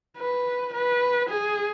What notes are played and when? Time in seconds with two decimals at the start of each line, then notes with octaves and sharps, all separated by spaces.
0.18 B4
0.73 B4
1.29 G#4